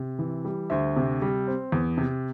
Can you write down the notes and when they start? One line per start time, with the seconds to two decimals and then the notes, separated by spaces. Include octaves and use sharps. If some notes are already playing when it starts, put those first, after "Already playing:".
Already playing: C3
0.19 E3
0.45 G3
0.70 D2 C5 E5
0.96 C3
1.22 G3
1.48 C4
1.72 E2
1.98 C3